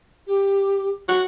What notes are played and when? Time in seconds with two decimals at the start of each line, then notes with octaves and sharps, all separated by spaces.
0.27 G4
1.08 F#4